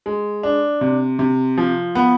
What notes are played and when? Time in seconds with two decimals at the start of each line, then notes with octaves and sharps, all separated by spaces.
0.06 G#3
0.43 D4
0.81 C3
1.19 C3
1.58 F3
1.95 B3